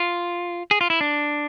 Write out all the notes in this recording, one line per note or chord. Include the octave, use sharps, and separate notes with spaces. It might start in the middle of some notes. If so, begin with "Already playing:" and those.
Already playing: F4
G#4
F4
E4
D4